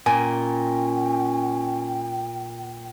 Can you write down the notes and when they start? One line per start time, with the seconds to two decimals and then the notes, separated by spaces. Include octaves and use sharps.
0.06 A#2 C#4 G5 G#5